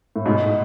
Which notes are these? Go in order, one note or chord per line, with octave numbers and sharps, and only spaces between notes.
A2
G#2 B2